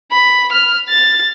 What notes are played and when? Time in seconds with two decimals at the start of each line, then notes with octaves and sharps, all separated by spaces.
0.11 B5
0.52 F6
0.89 A6